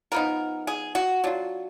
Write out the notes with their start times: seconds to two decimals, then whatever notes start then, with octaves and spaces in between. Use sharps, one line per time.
0.12 F3 B3 D#4 A#4
0.67 G#4
0.95 F#4
1.24 F#3 D4 F4